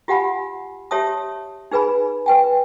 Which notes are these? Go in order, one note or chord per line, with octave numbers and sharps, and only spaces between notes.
F4 G4 F5 F#5 G#5 B5
G4 C#5 E5 A5 D#6
D#4 G#4 B4 G#5 B5
B4 G5 G#5